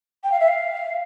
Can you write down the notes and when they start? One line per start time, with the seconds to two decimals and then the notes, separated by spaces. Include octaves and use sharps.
0.24 G5
0.32 F5
0.40 E5
0.48 F5